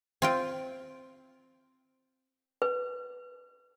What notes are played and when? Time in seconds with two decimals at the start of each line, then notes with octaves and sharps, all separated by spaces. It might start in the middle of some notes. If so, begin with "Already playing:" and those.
0.22 C4 F4 G5
2.62 B4